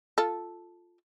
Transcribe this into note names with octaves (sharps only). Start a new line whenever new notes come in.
F4 A4